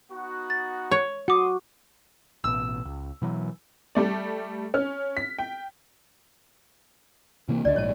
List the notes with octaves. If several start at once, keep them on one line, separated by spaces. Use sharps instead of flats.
B3 D#4 F#4
A6
C#5
A3 F#4 F#5 C6 D6 D#6
A1 B2 E6
C#2
B2 E3 F#3
G3 A3 D5
C#4 F6
B6
G5
C3 E3 A#3
C#2 D3 D5 D#5
A#1 G#2 C#5 A5